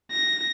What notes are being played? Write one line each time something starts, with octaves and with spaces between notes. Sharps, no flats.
A#6